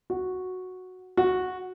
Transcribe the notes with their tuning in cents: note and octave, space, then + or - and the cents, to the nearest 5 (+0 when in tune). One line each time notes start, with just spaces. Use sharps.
F#4 -5
F#4 -10